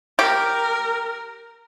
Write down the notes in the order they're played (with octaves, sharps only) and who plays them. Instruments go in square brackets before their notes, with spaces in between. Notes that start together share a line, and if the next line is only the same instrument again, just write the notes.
[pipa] G4 [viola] A#4